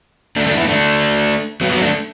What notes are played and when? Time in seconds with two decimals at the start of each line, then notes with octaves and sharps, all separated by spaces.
0.36 A3 D4
0.47 A3 D4
0.57 B3 E4
0.68 A3 D4
1.61 F#3 B3
1.71 F#3 B3
1.82 A3 D4